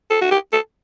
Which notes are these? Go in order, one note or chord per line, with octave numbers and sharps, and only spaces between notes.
A4
F#4
G4
A4